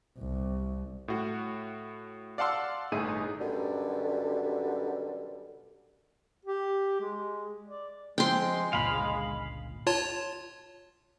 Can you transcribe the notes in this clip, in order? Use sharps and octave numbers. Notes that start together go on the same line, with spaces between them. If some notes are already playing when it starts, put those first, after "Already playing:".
C2
A2 F#4
D5 F5 F#5 A5 C6 E6
G1 A2 D#4 G#4 E5 D#7
F#2 B2 D3 G3
G4
G#3
D5
F3 G#3 C4 G5 C6
G1 C#2 A#2 F5 B5
F4 C#5 A5